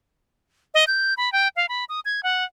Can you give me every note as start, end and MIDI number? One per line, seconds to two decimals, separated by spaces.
0.74 0.84 75
0.87 1.14 91
1.17 1.32 83
1.32 1.48 79
1.56 1.66 77
1.69 1.85 83
1.89 2.00 87
2.05 2.23 92
2.23 2.44 78